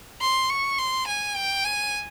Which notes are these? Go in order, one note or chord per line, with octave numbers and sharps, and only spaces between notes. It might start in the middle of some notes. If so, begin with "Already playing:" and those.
C6
C#6
C6
G#5
G5
G#5